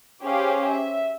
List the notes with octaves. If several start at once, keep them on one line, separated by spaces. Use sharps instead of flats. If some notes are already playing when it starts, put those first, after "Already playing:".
C#4 G4 G#4 C5 F5
E5